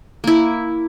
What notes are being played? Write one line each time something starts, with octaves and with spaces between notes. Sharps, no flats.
A#3 E4